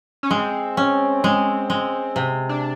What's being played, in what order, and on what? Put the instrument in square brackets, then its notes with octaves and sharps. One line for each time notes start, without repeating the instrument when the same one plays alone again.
[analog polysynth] C#4
[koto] G#3 [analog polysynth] C4
[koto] C#4
G#3
G#3
C3
[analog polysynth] D4